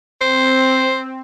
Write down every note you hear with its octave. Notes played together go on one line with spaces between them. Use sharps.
C4 C5